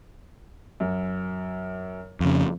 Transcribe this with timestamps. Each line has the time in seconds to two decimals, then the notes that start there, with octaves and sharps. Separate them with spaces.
0.80 F#2
2.20 F2 C#3